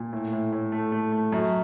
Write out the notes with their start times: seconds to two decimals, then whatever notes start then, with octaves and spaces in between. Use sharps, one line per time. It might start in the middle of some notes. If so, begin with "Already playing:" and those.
Already playing: A#2
0.13 A2
0.33 A2
0.52 A2
0.72 A3
0.92 A3
1.12 A3
1.32 F#2